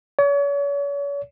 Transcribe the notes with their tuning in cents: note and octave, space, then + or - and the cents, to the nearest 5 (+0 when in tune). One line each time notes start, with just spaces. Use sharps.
C#5 +40